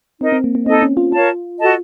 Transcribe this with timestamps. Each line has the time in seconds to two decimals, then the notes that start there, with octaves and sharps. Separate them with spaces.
0.21 C4 D#4 A#4 D#5
0.32 C4
0.44 A#3
0.55 A#3
0.66 C4 D#4 A4 D#5
0.82 C#4
0.97 F4
1.12 F4 A#4 C#5 F5 A5
1.58 F#4 A4 D#5 A5